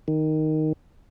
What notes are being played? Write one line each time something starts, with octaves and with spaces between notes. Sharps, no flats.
D#3